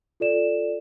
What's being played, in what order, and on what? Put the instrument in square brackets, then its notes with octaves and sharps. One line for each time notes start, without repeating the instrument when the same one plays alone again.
[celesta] F4 A4 D5 E7